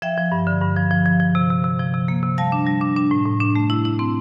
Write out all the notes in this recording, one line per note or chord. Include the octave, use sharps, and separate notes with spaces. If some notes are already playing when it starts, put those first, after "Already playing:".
F3 E5 G5
F3
G2
D3
G2
F3
F3
F3
F3
C3
C3
C3
F3
C3
A#3
C3
G3 F5 A5
D4
G3
D4
D4
A2
A2
D4
A3
E4
E4
C4